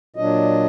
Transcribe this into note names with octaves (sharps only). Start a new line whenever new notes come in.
A#2 F#3 D4 D#5